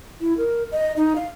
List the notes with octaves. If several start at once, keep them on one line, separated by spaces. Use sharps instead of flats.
E4
A#4
D#5
D#4
F5